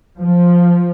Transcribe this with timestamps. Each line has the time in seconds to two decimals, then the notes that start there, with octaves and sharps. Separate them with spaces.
0.18 F3